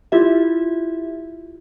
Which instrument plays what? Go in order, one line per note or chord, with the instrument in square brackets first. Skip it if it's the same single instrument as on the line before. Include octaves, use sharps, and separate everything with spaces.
[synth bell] E4 F4 G4 E5